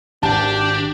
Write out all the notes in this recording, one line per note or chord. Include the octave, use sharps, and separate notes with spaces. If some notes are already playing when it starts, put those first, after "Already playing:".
G#1 D4 G4 A5